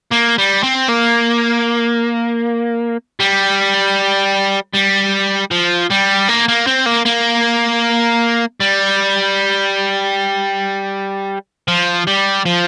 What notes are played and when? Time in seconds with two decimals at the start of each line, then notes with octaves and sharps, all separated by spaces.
0.11 A#3
0.38 G3
0.64 C4
0.89 A#3
3.20 G3
4.75 G3
5.51 F3
5.90 G3
6.28 A#3
6.48 A#3
6.67 C4
6.86 A#3
7.06 A#3
8.60 G3
11.68 F3
12.07 G3
12.46 F3